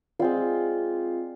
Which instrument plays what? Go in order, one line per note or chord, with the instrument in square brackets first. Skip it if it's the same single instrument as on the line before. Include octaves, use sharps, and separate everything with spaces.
[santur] G#3 C4 F4 D5